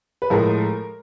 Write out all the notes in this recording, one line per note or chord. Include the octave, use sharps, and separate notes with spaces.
B4
A2 F3 G#3 A#4